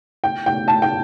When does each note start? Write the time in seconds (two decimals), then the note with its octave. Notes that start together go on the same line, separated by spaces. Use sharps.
0.24 G5
0.46 G5
0.68 A5
0.82 G5